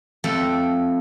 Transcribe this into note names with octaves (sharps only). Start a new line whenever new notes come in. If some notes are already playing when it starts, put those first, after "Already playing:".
F2 A3 A4 G5